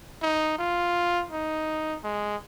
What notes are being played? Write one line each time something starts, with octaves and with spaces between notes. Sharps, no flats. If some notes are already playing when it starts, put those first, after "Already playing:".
D#4
F4
D#4
G#3